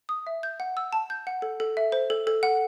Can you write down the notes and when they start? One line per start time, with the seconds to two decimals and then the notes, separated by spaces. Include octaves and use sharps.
0.09 D#6
0.27 E5
0.43 G6
0.60 F#5
0.77 E6
0.93 A5
1.10 G6
1.27 F#5
1.42 A4
1.60 A4
1.77 E5
1.92 C5
2.10 A4
2.27 A4
2.43 F#5